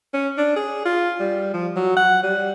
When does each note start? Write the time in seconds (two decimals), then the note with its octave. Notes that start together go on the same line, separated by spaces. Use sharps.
0.13 C#4
0.38 D4
0.56 G#4
0.85 F4
1.20 G3
1.54 F3
1.76 F#3
1.96 F#5
2.23 G3